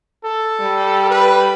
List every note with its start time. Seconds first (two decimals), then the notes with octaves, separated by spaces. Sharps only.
0.25 A4
0.60 G3
1.10 B4